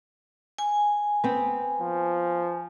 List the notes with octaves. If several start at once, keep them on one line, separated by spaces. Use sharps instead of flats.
G#5
B3 C4
F3